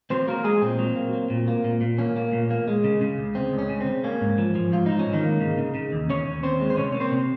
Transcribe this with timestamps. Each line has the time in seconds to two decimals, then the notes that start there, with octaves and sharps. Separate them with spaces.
0.10 F#3 C4 C5
0.28 F#3 A#3 A#4
0.44 F#3 G#3 G#4
0.62 A#2 C4
0.79 F#3
0.96 A#3
1.13 F#3
1.30 A#2
1.48 A#3
1.64 A#2
1.81 A#2
1.98 A#3 C#4
2.16 A#3
2.33 A#2
2.51 A#3
2.68 G#3
2.84 C#3
3.01 C#3
3.18 C#2
3.35 G#3 C4
3.52 C#2
3.59 C#4
3.70 C#3
3.81 C4
3.87 C#3
4.04 A#3 C#4
4.21 G#2
4.38 F3
4.55 F3
4.72 G#2 F4
4.86 F3 D#4
4.99 C#4
5.06 G#2
5.13 D#3 D#4
5.24 A#3
5.41 C#3
5.58 C#3
5.75 C#3
5.92 D#2
6.09 C#3 C#4 C#5
6.27 D#2
6.43 D#2 C4 C5
6.60 G#3
6.70 C5
6.77 C3 C#4 C#5
6.92 A#3 C#5
7.00 C4 C5
7.12 C3